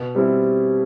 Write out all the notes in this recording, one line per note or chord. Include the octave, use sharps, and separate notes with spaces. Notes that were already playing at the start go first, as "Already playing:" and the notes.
Already playing: B2
G3 C4 E4